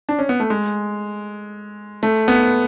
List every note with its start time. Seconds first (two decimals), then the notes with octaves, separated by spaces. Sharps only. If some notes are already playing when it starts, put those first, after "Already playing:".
0.09 D4
0.19 C#4
0.29 B3
0.40 A3
0.50 G#3
2.03 A3
2.28 B3